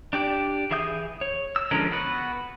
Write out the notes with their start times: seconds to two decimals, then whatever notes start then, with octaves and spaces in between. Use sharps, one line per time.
0.13 D4 G4 D5
0.71 E3 G#4 E5 D#6 G6
1.21 C#5
1.56 E6
1.71 D3 F3 G#3 C#4 A#4
1.91 B3 F#4 B4